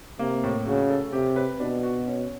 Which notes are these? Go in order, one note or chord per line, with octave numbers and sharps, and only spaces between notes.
C3 A#3
A2
C#3 F#4
A4
C3 G4
B4
B2 D4
F#4
C#4